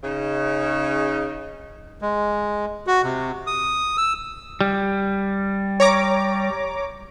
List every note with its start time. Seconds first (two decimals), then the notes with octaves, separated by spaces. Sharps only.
0.04 C#3 D#4
2.02 G#3
2.87 F#4
3.04 C3
3.47 D#6
3.97 E6
4.61 G3
5.80 C#5 A#5 D6